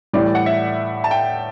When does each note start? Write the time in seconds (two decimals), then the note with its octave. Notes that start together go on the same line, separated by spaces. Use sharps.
0.13 A2 E3 G3 D5
0.35 F#5
0.46 E5
1.04 A5
1.11 G5